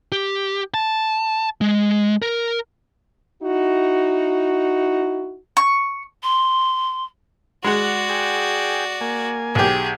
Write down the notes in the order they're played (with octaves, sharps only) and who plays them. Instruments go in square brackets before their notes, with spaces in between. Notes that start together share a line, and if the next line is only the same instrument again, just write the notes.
[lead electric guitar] G4
A5
G#3
A#4
[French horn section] D#4 E4 F#4
[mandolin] C#6
[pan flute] C6
[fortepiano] G#3 F#5 [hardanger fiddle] F#4 D5
[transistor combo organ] G#4 G5
A#3 G#5
[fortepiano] B1 G4 [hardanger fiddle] G#4